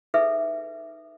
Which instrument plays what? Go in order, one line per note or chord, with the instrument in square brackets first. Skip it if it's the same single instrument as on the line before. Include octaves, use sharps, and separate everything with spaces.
[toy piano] D#4 G#4 A4 B4 E5